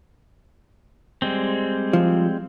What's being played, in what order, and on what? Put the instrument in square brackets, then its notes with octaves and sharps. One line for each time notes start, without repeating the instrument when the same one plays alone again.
[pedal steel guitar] G3 G#3 C4
[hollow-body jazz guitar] F3